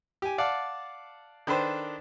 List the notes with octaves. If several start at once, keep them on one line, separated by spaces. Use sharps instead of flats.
G4 G#5
D5 F5 F#5 A5
D#3 D4 A4 B4 C5